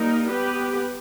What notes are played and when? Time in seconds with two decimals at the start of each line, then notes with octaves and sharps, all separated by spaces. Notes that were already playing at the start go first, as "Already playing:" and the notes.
Already playing: G3 A#3 D#4 A#4
0.29 B3 G4 B4